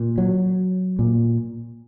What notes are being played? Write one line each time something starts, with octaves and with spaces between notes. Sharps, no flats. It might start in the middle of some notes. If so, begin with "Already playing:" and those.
Already playing: A#2
F#3
A#2